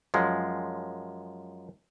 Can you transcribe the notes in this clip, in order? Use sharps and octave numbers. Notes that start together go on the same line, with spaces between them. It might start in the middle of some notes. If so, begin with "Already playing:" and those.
F#2 F3 G#3